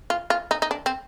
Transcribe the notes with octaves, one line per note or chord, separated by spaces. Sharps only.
F4
F4
D#4
D#4
D4
C4